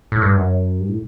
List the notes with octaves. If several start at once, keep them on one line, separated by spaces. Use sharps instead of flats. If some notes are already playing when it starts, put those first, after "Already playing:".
A2
G2
F#2
G2
A2